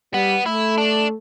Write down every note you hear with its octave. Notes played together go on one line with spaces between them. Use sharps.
G3 B3
A3 E4
D4